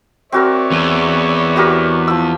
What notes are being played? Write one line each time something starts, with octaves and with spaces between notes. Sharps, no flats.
C4 F#4 A#4 C#5 D5 E5
E2
F#4 G4 A#4
F3 E6